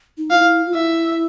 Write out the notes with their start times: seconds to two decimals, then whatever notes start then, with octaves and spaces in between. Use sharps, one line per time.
0.18 D#4
0.30 F4 F5
0.35 E4
0.66 F4
0.74 E4 E5